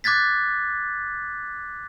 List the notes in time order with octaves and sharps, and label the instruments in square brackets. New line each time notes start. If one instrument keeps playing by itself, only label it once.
[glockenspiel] D6 F#6 G#6 A6 B6